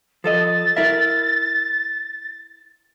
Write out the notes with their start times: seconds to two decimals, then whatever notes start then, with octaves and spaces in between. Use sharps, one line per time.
0.24 F3 A4 D#5 A6
0.77 E4 A#4 E5